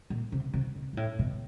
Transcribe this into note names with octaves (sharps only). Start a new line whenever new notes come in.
A#2
C3
C3
B2
A#2
A2
B2